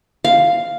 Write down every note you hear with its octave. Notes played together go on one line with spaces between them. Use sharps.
F5